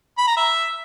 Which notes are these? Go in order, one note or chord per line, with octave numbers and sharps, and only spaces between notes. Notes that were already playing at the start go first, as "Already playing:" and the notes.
B5
A#5
E5